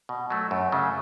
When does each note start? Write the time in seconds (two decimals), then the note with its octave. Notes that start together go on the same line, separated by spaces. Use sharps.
0.09 B2
0.30 F#3 A3
0.51 F#2
0.72 C#3 F#3 A3